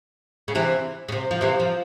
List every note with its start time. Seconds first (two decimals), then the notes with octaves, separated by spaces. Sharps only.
0.48 C#3
0.55 C3 E3
1.09 C#3
1.12 C3
1.31 F3
1.41 C3 E3
1.60 F3